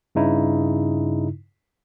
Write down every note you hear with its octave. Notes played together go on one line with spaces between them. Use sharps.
G2 C#3 D#4 E4